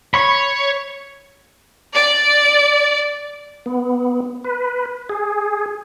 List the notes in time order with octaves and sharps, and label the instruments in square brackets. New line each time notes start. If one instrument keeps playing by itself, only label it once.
[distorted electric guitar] C#5 [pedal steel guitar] B5 C#6
[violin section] D5
[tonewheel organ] B3
B4
G#4